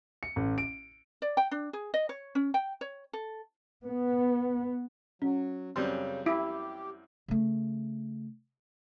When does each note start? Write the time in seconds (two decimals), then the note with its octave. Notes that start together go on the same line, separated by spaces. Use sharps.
0.23 C#7
0.36 A1
0.58 D7
1.22 D5
1.37 G5
1.51 D4
1.73 G#4
1.94 D#5
2.09 C#5
2.35 C#4
2.54 G5
2.81 C#5
3.13 A4
3.84 B3
5.22 F#3 C#4
5.76 F#2 C#3 G3 C4
6.26 E4 G4
7.28 C#3 A3